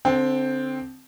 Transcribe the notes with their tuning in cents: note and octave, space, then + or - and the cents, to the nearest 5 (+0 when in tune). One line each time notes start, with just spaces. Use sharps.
D3 -15 C4 +0 G5 +5